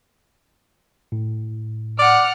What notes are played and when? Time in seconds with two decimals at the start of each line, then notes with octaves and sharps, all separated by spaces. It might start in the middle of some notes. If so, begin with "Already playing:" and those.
1.12 A2
1.99 D5 F#5 F6